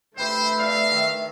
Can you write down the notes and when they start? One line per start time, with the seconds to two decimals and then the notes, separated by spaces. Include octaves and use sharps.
0.17 A3 G4 B4 C5 E5 G5
0.59 D5 F5
0.91 D#3